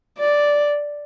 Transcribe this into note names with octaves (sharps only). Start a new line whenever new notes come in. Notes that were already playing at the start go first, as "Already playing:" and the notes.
D5